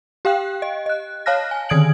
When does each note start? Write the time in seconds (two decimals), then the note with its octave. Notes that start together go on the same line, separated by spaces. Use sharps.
0.25 G4 F5 G5 F#6
0.62 D#5
0.86 D#5 F#6
1.26 C#5 F5 A5 F6 F#6 A#6
1.51 G#5
1.69 D3 D#3 D#6 G#6 D7 F#7